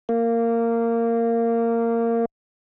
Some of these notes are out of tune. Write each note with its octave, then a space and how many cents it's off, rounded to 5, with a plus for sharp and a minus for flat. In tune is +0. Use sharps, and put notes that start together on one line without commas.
A#3 -15